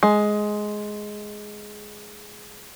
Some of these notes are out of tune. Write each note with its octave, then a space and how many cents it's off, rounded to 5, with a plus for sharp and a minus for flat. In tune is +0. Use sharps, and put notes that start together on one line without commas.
G#3 +10